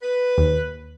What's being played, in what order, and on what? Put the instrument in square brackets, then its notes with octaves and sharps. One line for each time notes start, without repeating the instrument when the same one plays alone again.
[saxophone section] B4
[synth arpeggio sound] D#2